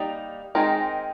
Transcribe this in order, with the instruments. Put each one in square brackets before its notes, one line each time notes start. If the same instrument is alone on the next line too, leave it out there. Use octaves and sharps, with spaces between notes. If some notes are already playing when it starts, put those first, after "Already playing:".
Already playing: [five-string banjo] G3 A#3 D#4
D#3 G#3 C4 D#4 A#4